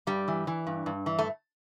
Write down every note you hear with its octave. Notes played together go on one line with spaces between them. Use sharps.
G2 G3
E3
E3
G2
G2
E3
A3